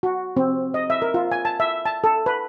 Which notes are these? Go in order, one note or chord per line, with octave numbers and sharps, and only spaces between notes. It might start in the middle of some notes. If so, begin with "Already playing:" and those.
F#4
C4
D#5
E5
A#4
F4
G#5
A5
E5
A5
A4
B4